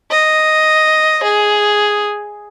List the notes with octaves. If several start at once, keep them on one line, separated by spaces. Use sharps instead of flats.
D#5
G#4